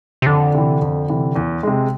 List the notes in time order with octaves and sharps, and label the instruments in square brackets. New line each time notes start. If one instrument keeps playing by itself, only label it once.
[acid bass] C3
[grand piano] F2 [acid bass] D3
[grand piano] C3 E3
F2
C3 E3
E2
C3 G#3